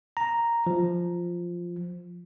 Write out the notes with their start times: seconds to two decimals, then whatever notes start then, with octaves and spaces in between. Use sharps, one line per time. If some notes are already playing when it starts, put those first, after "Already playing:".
0.17 A#5
0.67 F3